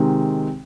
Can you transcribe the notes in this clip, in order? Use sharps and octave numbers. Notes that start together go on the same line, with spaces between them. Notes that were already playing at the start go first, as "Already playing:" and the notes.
Already playing: C3 D#3 G#3 C4